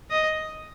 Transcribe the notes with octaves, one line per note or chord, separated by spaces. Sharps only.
D#5